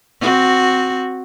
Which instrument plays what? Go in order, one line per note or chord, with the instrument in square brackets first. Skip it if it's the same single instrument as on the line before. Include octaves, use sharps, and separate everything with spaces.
[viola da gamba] C4 F#4